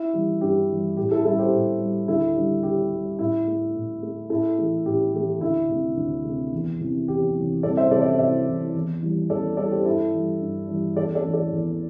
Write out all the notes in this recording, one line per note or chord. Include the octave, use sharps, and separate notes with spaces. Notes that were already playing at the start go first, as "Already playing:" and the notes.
Already playing: E4
E3 G3
G2 G4
E3 G3
A2 G4
E4 A4
G3 E4 A4
G4 C5
A2
G3
D2 E4 A4
D3 G3
D2 G4
D3 G3
A2 E4
A3
A2
A3
A2 E4 A4
E3 A3
A2 G4
E3 A3 G4
D2 E4
C3 A3
D2
C3 A3
E2
C3 E3
E2 G4
C3 E3
C2 A4 D5
C5 E5
C3 E3 A4 D5
D5
C5 E5
C2 C5 E5
C3 E3
E2
E3 G3
E2 A4 D5
E3 G3 A4 D5
G4 C5
G2 E4 A4
E3 G3
G2
E3 G3
E2 A4 D5
A4 D5
E3 A3
A4 D5
E2